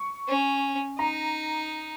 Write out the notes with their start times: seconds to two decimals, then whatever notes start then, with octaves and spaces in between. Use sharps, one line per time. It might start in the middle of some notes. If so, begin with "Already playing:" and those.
Already playing: C#6
0.28 C#4
0.98 D#4 A#5